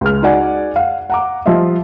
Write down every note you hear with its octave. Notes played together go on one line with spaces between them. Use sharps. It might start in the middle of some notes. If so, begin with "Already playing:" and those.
C#2 G#3 F6
D#4 F#4 G#4 D5 F#5 G#5
F5 F#5
F#5 A#5 D6
F3 G3 F4 D#5 E5